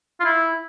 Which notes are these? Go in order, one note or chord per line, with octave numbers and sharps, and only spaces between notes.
F4
E4